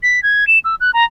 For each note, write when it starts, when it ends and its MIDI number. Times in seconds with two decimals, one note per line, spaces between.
0.03 0.23 95
0.23 0.47 92
0.47 0.59 100
0.65 0.75 88
0.81 0.91 90
0.94 1.05 82